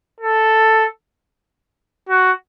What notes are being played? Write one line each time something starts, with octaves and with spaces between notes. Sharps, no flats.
A4
F#4